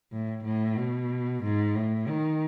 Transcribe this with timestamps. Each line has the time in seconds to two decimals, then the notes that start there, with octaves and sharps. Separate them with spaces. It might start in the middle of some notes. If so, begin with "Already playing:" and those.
0.12 A2
0.44 A2
0.77 B2
1.43 G#2
1.75 A2
2.08 D#3